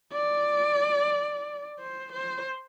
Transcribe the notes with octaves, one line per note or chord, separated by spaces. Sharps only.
D5
C5
C5